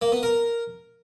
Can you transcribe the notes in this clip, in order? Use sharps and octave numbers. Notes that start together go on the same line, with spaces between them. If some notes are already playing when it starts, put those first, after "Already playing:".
A#3
B3
A#4